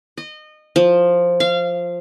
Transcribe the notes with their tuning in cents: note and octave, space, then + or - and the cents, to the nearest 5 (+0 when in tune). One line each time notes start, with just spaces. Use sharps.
D#5 -25
F3 +5
F5 -20